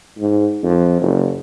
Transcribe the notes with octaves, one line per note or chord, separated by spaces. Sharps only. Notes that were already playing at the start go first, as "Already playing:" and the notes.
G#2
F2
F#1